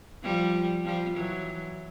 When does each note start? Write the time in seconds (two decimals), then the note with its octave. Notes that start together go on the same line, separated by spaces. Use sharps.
0.23 F3 G3
0.85 F3 G3
1.16 E3 F#3